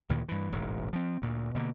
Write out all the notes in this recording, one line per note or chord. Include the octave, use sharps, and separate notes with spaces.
D2 A#2 D#3 E3
G2 E3
E1 A1 G#2
F3 C4
D2 A#2
B2 D3 A#3